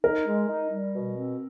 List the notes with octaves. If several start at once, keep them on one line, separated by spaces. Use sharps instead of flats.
D#4 A#4
G#3
D#4
G3
B2
C4